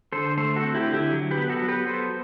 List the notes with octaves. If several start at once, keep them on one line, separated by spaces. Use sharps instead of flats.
D3 A4 C5
A3 A4 C5
F#4 A4
C4
E4 G4
D3
E4 G4
F#3
G4 B4
B3
F#4 A4
F#3
G4 B4
B3 A4 C5